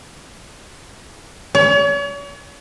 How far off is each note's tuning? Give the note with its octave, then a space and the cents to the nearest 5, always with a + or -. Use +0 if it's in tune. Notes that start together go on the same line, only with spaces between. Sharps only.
C#5 +40